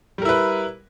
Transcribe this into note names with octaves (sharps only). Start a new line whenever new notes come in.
G3 E4 A#4 B4